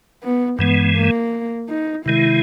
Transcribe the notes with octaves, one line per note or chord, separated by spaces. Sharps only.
B3
G2 E3 G#3 B3
A#3
D#4
C3 D#3 G#3 E4